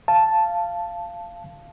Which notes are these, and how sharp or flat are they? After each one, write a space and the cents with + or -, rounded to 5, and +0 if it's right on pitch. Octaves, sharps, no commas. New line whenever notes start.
F5 -15 A5 +0